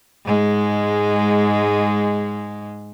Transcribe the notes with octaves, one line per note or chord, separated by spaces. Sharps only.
G#2 G#3